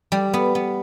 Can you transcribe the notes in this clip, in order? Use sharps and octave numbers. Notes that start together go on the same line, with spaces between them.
G3
B3
B3